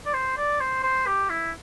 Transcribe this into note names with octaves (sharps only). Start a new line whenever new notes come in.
D5
C5
D5
C5
C5
G4
E4